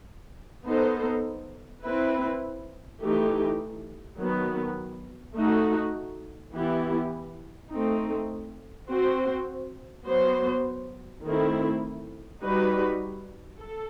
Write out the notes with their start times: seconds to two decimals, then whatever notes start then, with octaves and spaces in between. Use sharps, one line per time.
0.65 B3 D#4 A4 C5
1.82 C4 E4 B4
3.00 E3 A3 D#4 G4
4.18 D#3 F#3 B3
5.35 A3 D#4 F#4
6.53 E3 B3 E4 G4
7.71 A3 C4 D#4
8.88 C4 F#4 C5
10.06 F#3 B3 F#4 C5
11.23 D#3 A3 C4 E4
12.42 G3 D#4 F#4 B4
13.59 A4